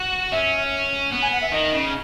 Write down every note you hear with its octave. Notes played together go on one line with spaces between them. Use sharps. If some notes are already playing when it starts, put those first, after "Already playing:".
Already playing: F#4
C#4 E5
B3
G#5
F#5
E5
D#3 D#5
C#3